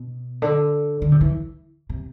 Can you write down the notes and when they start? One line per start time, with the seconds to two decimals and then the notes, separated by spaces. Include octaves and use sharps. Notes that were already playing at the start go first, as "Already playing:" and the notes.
Already playing: B2
0.42 D3
1.02 D3
1.12 C3
1.21 E3
1.90 C3